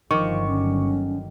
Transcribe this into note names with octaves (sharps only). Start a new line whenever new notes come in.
G1 D3 D#3 F3 F#3 C#6 D6
C#4